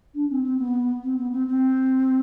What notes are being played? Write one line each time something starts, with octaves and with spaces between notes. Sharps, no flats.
D4
C4
C4
B3
C4
B3
C4
C4